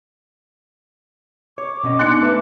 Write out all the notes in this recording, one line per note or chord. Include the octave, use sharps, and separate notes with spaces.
C#5 D6
B2 C#4 D#5
B3 D4 D#4 C6 F#6 C#7
A3 B4 E5 D6